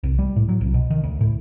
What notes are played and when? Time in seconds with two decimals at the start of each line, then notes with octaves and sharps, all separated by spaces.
0.03 C2
0.19 G3
0.36 A2
0.49 F#3
0.61 C2
0.74 B2
0.90 D#3
1.04 D2
1.21 A2